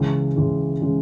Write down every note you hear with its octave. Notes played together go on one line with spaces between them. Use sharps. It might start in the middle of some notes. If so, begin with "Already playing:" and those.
Already playing: C#2 C#3 E3 G#3
C#2 C#3 E3 G#3
C#3 E3 G#3